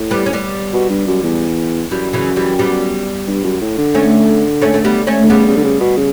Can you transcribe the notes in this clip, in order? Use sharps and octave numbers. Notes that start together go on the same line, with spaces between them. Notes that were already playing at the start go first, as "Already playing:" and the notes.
Already playing: A2
G3 B3
C#4
G3 B3
B2
G2
F#2
E2
F#2 E3 G3
C#3 E3
E3 G3
G3 B3
G2
F#2
A2
D3
A3 C#4
A3 C#4
A3
G3 B3
A3 C#4
D3
C#3 G3 B3
C#3
D3
C#3
B2
C#3